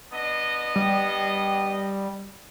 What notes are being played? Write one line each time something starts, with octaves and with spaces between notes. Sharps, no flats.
B3 D4 D#5
G3